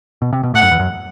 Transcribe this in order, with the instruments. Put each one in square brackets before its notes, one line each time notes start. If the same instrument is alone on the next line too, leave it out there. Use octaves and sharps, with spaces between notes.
[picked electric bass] B2
C3
B2
[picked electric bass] A2 [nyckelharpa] F#5
[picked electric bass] F#2
E2
F#2